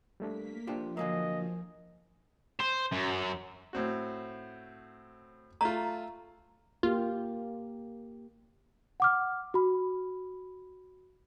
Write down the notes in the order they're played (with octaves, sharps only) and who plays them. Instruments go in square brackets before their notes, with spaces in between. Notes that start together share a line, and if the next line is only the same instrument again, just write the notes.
[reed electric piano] G3 A3 D4 [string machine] A#3 B6
[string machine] F3 [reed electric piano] A#3 D4 F4 [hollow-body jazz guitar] G4 C5
[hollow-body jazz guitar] D3 F#3 A#3 [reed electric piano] A#4 G#5 [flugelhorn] D#5
[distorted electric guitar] C5
F#2
[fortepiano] A2 C4 F#4
[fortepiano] A3 F4 [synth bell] A#5
[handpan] A#3 G4 [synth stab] F4
[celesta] F#5 D6 F6
F#4 B5